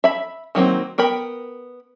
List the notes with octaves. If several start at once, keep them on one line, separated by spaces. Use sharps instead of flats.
E5 B5
D#3 F#3 A#3 C4
B3 A#4 G5 B5